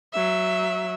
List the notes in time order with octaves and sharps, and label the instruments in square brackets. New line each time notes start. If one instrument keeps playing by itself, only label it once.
[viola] F#3 E5